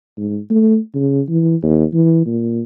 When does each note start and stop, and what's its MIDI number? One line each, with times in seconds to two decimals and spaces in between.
0.17 0.38 44
0.50 0.77 57
0.94 1.21 49
1.29 1.55 52
1.63 1.84 39
1.93 2.21 52
2.26 2.63 46